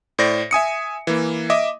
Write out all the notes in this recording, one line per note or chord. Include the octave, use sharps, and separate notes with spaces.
A2 C5 D5 A#6
E5 G#5 D#6 C#7
E3 A#3
D#5 E5 D6 D#6